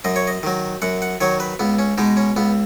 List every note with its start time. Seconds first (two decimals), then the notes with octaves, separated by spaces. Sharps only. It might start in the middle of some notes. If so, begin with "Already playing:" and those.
0.05 F#2 D#5
0.16 C#5
0.27 D#5
0.43 D#3 F#3
0.82 F#2 F#5
1.02 F#5
1.21 D#3 F#3 C#5
1.40 B4
1.59 C#2 B3
1.79 C#4
1.98 B2 G#3 D#4
2.17 C#4
2.36 C#2 B3